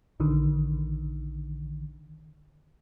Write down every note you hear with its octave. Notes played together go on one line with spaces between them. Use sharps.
A#1 D3 D#3